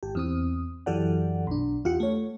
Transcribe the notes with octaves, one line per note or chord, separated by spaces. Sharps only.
G#1 G4
E2 C4 D#6
F#2 E3 G4 A4 D5 F#5
B1 D4
E2 F4 G4 F#5 C#7
A3 C#5